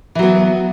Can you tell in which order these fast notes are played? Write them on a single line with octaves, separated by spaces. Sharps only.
E3 F#3 B3